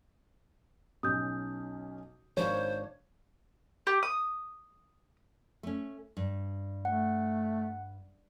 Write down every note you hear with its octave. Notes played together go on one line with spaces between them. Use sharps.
B1 C#4 D#6 G6
G#1 D4 C5 C#5 F5
G4
D#6
A3 C#4
G2
A3 F#5